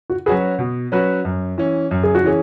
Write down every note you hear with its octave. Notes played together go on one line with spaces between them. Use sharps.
F#4
F#3 C#4 F#4 G#4 B4
B2
F#3 C#4 F#4 B4
F#2
E3 C#4
F#2
G#4
F#4
E3 C#4 G#4